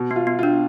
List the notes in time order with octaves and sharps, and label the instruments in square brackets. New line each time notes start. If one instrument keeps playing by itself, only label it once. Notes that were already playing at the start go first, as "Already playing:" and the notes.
Already playing: [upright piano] B2
[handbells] B3
[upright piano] F4
[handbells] B3
[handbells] D4 [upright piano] F4